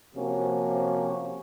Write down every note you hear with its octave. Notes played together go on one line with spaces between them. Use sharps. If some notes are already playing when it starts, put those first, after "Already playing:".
C3 F3 A#3 C#4 F#4